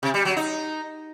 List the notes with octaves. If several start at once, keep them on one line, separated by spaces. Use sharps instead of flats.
C3
G3
F#3
D#4